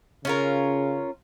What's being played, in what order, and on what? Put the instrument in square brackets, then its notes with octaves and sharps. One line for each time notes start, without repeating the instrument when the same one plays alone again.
[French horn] C#3 [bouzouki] C#4 F4 A#4